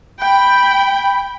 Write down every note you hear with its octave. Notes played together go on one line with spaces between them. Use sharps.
G5 B5